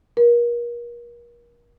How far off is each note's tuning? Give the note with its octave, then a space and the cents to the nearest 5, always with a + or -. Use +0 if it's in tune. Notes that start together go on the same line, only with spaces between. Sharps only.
A#4 +35